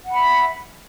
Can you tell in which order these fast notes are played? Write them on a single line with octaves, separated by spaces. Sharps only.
F#5 B5 E5